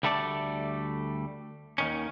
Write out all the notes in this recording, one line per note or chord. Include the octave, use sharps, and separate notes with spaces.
D2 G3 A3 A4 D5
D#2 D#3 C#4